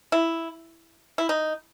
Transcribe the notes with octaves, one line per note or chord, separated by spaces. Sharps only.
E4
E4
D#4